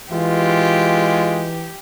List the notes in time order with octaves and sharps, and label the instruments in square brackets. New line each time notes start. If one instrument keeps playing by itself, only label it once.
[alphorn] E3 [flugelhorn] G#3 [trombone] F4 [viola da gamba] G4